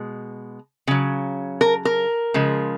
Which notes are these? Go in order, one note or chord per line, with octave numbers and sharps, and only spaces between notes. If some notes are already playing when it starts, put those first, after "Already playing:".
Already playing: B2 G#3
C#3 F#3
A#4
A#4
C#3 F3 G#3